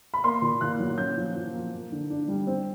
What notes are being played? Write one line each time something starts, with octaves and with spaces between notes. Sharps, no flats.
B5
A#3 C6
A#2
A#2 F#6
F#3
C#4 G6
F3
F3
A#3
A#3
D3
D4
G3
C4